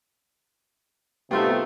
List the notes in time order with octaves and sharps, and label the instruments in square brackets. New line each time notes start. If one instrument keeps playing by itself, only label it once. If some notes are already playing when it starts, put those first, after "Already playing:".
[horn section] C3 A3 [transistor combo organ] B3 G4 [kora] D#4 F4 G#4